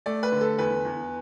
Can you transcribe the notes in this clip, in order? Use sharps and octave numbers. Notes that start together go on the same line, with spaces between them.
A3 D5
B4
D3
A4
E2 B4
E2